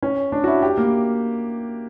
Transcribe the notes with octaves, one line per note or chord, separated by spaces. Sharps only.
C#4
D4
F#4
E4
G4
A#3